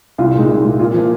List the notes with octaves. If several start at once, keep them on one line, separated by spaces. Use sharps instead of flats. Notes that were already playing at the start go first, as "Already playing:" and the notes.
C2 F4
F4
A#2 G#3 D#4
C2
A#2 G#3
A#2 F4
F3 A#3